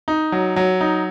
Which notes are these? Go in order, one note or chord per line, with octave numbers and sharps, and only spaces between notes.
D#4
F#3
F#3
D#4